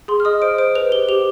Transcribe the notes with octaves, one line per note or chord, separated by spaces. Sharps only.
G#4 C6
F6
D#5 D#6
C5 D7
C5 D7
B4 F7
G4 G7
G4 F7